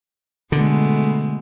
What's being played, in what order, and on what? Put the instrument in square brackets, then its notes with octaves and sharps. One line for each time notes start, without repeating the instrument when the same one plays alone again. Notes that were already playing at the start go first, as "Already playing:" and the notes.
[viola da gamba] B2 G#3 A3 [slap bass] D3